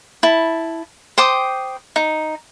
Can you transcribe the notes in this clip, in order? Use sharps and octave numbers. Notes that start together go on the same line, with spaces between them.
E4 A5
C5 G5 D6 D#6
D#4